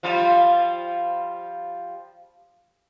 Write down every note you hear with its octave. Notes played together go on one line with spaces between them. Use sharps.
F3 G3 F4